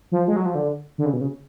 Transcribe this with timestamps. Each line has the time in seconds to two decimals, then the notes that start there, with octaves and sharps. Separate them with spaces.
0.12 F3
0.28 G#3
0.36 F#3
0.46 F3
0.55 D3
0.98 D3
1.06 C#3
1.13 B2
1.21 C#3